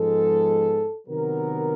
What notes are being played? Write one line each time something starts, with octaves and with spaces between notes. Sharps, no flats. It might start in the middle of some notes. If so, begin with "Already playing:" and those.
Already playing: G#2 F3 G#3 B3 A4
C3 D#3 F#3 B3 A#4